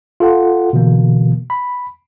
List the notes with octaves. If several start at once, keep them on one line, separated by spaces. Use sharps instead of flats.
F4 A4 F#5
B2 D3 E3 A#3
B5